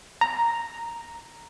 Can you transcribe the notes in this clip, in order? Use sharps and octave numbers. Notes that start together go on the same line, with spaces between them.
A#5